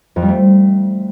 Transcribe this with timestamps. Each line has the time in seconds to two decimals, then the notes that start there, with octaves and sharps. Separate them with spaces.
0.16 F2
0.22 G3
0.28 A3